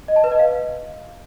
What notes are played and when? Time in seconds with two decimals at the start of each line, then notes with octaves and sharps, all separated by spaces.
0.08 D#5
0.16 A5
0.24 B4
0.32 D#5
0.39 F5